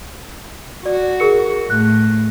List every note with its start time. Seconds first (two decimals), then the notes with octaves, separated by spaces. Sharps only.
0.86 F#4 D5
1.20 G#4 A#4 C#7
1.70 A2 F#6